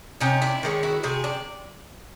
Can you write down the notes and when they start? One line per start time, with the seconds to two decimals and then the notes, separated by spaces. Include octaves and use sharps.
0.20 C3 C#4 D#4
0.42 D4 E4
0.63 D#3 G#3 C#4
0.83 E4 F#4
1.03 C3 F#4 G#4
1.24 D4